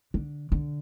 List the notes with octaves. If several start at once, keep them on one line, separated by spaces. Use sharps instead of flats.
D3
D3